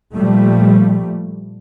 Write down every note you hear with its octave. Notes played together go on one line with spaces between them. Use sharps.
A#2 F3 G3 A3